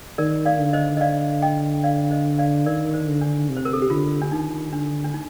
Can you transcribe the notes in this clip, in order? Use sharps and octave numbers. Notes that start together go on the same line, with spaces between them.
D#3 A#4 D5
D5 F5
D3
C5 D#5
D#5
D5 F5
D#5 G5
D5 F5
C5 D#5
D5 F5
D#3 A#4 D5
C5
D3
D4
C3
C5
A#4
A4
G4
D3 F4
D4
D#3 D#4
D3 D4
D4
D#4